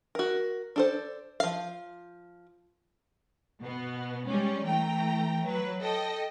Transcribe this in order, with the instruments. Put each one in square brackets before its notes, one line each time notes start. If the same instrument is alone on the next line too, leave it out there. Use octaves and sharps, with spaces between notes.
[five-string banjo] F#4 A#4
D4 A4 C5
F3 F5
[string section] B2 B3
G3 G#3 C#4
E3 A3 G5 A#5
F#3 B4
A4 D#5 G5